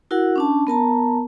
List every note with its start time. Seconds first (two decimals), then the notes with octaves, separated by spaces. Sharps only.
0.11 E4 F#4 A#4 F#5
0.36 C#4 D4 A5
0.67 B3 A#4 A5 A#5